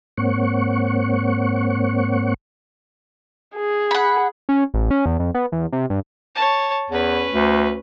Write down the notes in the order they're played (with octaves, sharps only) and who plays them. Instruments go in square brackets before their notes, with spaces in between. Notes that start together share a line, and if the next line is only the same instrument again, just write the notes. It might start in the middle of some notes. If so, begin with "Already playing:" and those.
[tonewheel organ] G#2 A#3 C4 C#5 F#5 C#6
[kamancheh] G#4
[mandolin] F#5 B5
[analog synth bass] C#4
A1
C#4
E2
F2
B3
E2
C3
G2
[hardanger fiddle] C#5 A5
[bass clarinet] E2 [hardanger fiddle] C#4 B4
[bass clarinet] D2